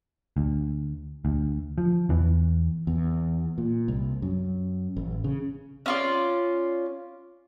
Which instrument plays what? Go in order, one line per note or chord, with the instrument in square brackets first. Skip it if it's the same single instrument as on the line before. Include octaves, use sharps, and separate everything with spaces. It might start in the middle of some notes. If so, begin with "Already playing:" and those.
[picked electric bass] D2
D2
F3
E2 E3
[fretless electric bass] E2
A#2
C2
F#2
A1
C#3
[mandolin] C#4 F4 D5